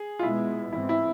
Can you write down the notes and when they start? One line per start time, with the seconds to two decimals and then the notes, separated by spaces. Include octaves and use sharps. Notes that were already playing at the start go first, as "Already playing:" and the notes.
Already playing: G#4
0.19 F4
0.23 B2 G#3 B3 E4
0.72 G#2 E3 G#3 C4 E4
0.89 E4